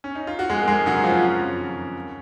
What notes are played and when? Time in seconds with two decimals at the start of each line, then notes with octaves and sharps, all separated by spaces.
0.04 C#4
0.15 D#4
0.27 F4
0.39 F#4
0.49 F2 G#3 G#4
0.62 A#4
0.68 F2 G#3 G#4
0.86 C#3 F#3 F#4
1.04 F2 F3 F4
1.22 F#2 C#4
1.41 F#2
1.58 D#3
1.78 D#3
1.95 D#2